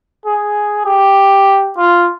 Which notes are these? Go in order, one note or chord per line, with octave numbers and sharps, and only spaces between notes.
G#4
G4
F4